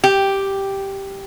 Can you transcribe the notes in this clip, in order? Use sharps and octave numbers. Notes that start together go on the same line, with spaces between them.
G4